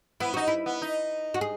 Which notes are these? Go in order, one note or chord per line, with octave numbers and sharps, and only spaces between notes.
B3 E4
D#4 F#4
E4
B3
D#4
F#4
G#4